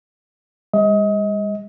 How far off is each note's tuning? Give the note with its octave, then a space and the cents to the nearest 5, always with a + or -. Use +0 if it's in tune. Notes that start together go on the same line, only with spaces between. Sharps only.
G#3 -45 D#5 +30